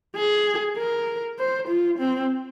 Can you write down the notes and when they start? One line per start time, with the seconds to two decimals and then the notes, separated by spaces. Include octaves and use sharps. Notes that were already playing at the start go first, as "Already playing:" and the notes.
0.16 G#4
0.78 A#4
1.39 C5
1.69 F4
1.99 C4